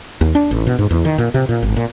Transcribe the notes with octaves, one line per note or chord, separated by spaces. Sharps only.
D#2
D4
A1
B2
G#2
E2
D#3
A#2
C3
A#2
G#1
A#2